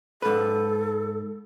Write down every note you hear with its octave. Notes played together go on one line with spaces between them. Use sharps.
G#2 A4 B4